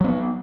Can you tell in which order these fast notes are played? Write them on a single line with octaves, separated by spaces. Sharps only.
F#3 C4 B3